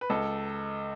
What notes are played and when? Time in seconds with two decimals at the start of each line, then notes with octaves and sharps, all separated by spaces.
0.01 B4
0.10 C#2 A4